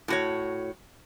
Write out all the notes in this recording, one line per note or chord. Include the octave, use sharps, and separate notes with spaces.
A2 F#4 C#5